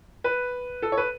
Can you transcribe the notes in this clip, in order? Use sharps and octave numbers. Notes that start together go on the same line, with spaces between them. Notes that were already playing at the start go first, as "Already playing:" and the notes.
B4
A4
C#5
B4